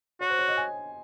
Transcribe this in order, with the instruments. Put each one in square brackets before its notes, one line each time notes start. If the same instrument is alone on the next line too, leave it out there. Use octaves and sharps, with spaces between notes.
[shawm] F#4 [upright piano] C#5
[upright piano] C5
C#5
D#5
G#5